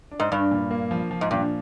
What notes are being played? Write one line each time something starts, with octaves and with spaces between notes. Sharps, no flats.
D4
G#2
G2 D4
A#2
A#3
F3
F3
G#2
G2 A#2